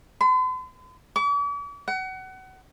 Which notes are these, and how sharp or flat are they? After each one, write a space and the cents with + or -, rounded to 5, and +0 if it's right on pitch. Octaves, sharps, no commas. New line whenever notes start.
C6 -45
D6 -45
F#5 +30